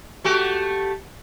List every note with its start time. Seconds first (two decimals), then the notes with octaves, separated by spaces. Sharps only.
0.24 A3 F#4 G4